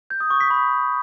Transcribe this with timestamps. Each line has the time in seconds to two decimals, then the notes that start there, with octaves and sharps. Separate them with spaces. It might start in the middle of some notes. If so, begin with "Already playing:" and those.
0.10 G6
0.20 D#6
0.30 C#6
0.40 B6
0.51 B5